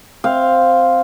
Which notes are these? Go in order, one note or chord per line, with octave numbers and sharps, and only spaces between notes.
C4 F5